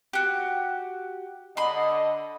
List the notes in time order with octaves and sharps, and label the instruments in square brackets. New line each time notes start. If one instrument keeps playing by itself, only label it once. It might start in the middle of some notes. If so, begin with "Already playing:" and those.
[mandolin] F#4 G4
[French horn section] D3 D#5 [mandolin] B5 C6